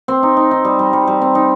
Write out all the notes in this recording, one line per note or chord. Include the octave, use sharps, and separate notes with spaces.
C4
D#4
D#4
D#4
G3
G3
G3
G3
C4
D#4